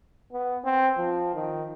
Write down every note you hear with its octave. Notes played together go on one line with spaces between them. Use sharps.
B3
C4
F3
D#3